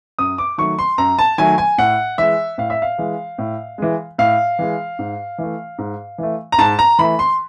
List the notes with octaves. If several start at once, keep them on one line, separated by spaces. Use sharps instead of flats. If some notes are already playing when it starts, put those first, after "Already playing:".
F#2 D#6
D6
D#3 F#3 A3 C#6
C6
F#2 A#5
A5
D#3 F#3 A3 G#5
G#5
A2 F#5
E3 G#3 E5
A2 F5
E5
F5
E3 G#3
A2
E3 G#3
A2 F5
E3 G#3
G#2
E3 A3
G#2
E3 A3
A#5
G#2 A5
A#5
E3 A3 B5
C6